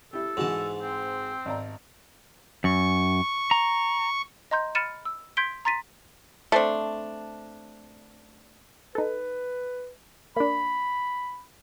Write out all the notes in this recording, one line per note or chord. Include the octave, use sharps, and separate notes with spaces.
E4 G4 A4
G#2 E3 F#4 A5
C4
G#1 D5 A#5
F#2 C#6
A#5
D#5 A#5 C6 G6
B5 F6 A6 C#7 D#7 E7
E6
C6 G6 G#6 B6 D7 G7
A#5 C6 A6 B6 D#7
A3 C4 D4
D#4 A4 B4
A#3 D4 B5